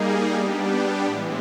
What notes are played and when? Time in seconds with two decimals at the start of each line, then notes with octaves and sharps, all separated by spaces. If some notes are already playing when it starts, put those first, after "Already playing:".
Already playing: G3 A#3 D#4 G#4
0.34 G3 B3 D4 G4
1.05 A2 E3 G#3